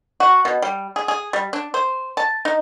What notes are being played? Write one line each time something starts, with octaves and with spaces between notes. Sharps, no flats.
F#4
B2
G3
G#4
G#4
G3
D4
C5
A5
D#4